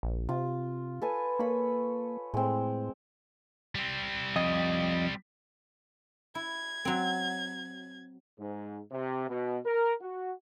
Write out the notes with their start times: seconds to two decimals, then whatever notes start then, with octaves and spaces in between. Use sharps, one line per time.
0.03 A#1
0.29 C3 F4
1.02 A4 B4 G#5
1.39 A#3 C#5 B5
2.34 A2 G#3 C4
3.75 G3 C4
4.36 F2 D#5
6.35 E4 G#6
6.85 F#3 C4
8.39 G#2
8.92 C3
9.29 B2
9.65 A#4
10.02 F#4